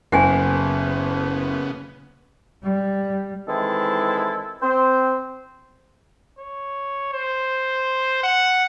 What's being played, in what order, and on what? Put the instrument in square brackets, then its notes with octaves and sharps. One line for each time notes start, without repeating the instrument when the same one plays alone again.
[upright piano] F#1 [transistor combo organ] C#3 B3 [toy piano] F#5 G#5
[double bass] G3
[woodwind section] D#3 E3 G#3 C4 E4 A4
C4 C5
[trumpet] C#5
C5
F#5